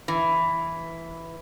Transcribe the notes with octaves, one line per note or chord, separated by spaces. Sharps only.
E3